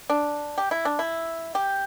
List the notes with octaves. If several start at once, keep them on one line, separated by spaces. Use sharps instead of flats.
D4
G4
E4
D4
E4
G4